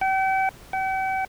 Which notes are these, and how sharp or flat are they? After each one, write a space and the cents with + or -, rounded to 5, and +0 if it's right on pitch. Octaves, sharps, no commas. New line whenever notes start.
G5 -40
G5 -45